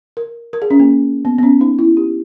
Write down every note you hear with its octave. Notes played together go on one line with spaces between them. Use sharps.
A#4
A#4
G#4
C#4
A#3
B3
B3
C#4
D#4
E4
G4